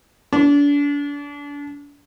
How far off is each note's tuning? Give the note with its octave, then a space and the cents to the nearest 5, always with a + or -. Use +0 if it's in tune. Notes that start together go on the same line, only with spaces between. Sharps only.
D4 -35